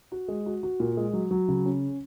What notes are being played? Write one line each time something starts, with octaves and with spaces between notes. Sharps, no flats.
F#4
G#3
F#4
F#4
A#2
G#3
F#3
F#3
C#3
C#4